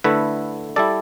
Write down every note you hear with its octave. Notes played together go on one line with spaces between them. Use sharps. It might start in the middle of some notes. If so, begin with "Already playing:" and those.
D3 A3 E4 B4 E5
G3 E4 A4 D5